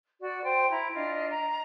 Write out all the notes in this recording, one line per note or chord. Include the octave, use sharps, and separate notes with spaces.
F#4 D5
C5 G5
E4 A#5
D4 F4 D#5
A#5